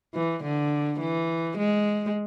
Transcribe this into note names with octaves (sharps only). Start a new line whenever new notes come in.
E3
D3
E3
G#3